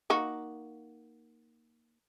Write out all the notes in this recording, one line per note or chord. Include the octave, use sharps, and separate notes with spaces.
A#3 D#4 F#4